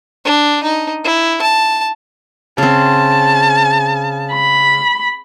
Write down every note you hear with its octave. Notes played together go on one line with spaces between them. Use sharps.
D4
D#4
E4
A5
C#3 C4 A5
B5